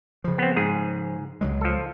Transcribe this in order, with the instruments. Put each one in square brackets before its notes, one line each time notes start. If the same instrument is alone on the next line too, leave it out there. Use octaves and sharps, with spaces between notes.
[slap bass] C#3 F3
[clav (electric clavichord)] B3 C4
G#2 G#4
[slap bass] C#2 F#3 G#3
[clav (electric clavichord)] F3 A4